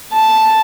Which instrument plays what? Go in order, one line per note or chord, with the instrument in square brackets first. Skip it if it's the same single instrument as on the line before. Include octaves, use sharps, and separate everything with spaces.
[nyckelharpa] A5